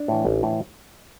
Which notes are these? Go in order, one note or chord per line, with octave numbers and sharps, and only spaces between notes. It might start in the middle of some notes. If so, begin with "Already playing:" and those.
Already playing: D4
A2 E3
A1
A2 E3